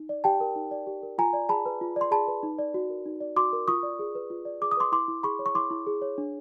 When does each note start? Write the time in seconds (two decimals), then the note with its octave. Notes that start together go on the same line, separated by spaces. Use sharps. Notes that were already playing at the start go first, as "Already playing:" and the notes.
Already playing: D#4
0.09 D5
0.24 G4 G5 A5
0.40 A#4
0.56 D#4
0.71 D5
0.87 G4
1.03 A#4
1.18 F4 G#5 A#5
1.33 D5
1.49 G#4 A5 B5
1.66 B4
1.81 F4
1.96 D5 C6
2.11 G#4 A5 B5
2.28 B4
2.43 D#4
2.59 D5
2.74 F#4
2.90 A#4
3.06 D#4
3.21 D5
3.36 F#4 C6 D6
3.53 A#4
3.68 F4 C#6 D#6
3.83 D5
3.99 G#4
4.15 B4
4.30 F4
4.45 D5
4.61 G#4 D6
4.71 D#6
4.77 B4 C6 D6
4.92 E4 C6 D6
5.08 E4
5.23 G#4 B5 C#6
5.39 C#5
5.46 C#6
5.55 E4 C6 D6
5.70 E4
5.87 G#4
6.02 C#5
6.18 D4